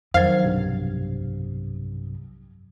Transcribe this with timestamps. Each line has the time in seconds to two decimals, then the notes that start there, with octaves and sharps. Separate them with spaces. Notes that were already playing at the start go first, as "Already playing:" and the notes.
0.14 F2 D#3 F#3 C5 F5 G#6
0.43 B1 G2 C3